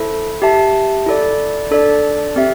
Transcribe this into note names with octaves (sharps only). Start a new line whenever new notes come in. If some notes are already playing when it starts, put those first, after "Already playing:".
Already playing: E4 A4 C5
G4 E5 A5
E4 A4 D5
D4 A4 D5
C4 G4 E5